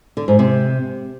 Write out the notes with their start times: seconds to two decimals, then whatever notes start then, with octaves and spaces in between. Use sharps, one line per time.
0.17 D3
0.28 G#2
0.39 C3